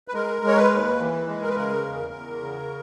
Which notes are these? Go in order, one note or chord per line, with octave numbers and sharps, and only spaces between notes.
B4
G#3 A#4
G#3
C#5
B4
D#2
E3
G#3
A#4
B4
C#3 A#4
E2
E2
C#3